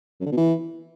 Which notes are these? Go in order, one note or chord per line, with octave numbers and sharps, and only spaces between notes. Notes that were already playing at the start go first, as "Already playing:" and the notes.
F#2
D3
B2
E3